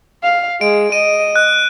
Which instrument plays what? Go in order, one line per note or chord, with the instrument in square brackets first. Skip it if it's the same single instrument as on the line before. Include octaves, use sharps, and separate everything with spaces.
[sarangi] F5
[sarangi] G#3 [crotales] D7
[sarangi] D#5 [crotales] D#7
[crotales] F#6